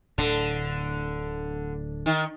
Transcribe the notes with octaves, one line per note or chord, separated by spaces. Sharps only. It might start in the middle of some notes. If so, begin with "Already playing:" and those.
D1 A2 D3
D#3